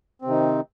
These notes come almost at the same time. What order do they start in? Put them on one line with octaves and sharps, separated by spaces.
C4 C3 D#3 D#4